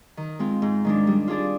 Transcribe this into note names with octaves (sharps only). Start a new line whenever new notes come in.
D#3
G#3 C4 F4
G#2
D#3 G#3 D4
G3
D4 F4 G#4 D5